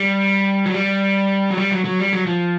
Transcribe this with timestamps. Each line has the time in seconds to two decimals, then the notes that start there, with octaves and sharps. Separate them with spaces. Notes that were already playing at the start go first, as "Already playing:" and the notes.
Already playing: G3
0.66 F#3
0.74 G3
1.50 F#3
1.58 G3
1.71 F#3
1.85 F#3
1.99 G3
2.13 F#3
2.27 F3